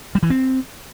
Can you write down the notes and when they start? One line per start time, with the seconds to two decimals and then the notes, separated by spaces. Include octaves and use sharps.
0.15 G3
0.23 E3
0.30 C4